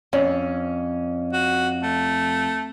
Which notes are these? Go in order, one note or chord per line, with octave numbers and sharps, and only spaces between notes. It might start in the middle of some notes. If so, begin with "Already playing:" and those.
F2 C#4
F#4
A3